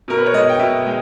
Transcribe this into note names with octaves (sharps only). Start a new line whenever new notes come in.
B2 A#4
B4
C#5
G#3 B3 D#5
G5
B2 E5
G#3 G5